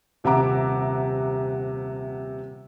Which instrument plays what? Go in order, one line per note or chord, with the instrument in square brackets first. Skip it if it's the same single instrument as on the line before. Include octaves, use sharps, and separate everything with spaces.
[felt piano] D#1 C3 E5 F#5 A#5 D6